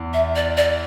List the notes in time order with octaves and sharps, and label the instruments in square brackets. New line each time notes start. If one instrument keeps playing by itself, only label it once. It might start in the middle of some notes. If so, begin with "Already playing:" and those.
Already playing: [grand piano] E2
[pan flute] E5
D5
D5